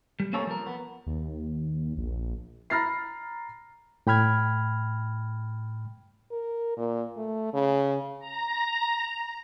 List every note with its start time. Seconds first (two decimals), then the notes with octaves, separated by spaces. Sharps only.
0.20 G3
0.33 A#3 C4 C#4 A4 A#4 C#5
0.47 F3 A#4
0.67 B3
1.06 D#2
1.97 A#1
2.70 A#5 B5 F6 A6 A#6 C7
4.07 A2 G5 B5 F6 G#6
6.31 A#4
6.77 A#2
7.17 A3
7.54 C#3
8.19 A#5